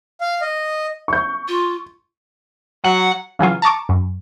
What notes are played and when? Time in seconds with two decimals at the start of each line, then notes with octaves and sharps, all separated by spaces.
0.21 F5
0.41 D#5
1.08 C#6 G6
1.48 F4
2.84 F#3 F#5
3.39 C#3 E3 F#3 F4
3.62 A5 A#5 C#6 D6
3.89 F#2